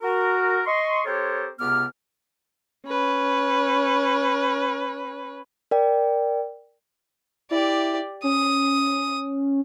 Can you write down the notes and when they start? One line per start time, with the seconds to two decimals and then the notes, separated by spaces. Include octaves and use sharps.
0.02 F#4 A#4
0.66 D#5 C6 C#6
1.05 C4 G4 A4 A#4 C5 C#5
1.59 C#2 C3 B3 D6 F6
2.87 C#4 B4
5.71 A#4 D5 G5
7.51 E4 G4 D5
8.23 C#4 D#6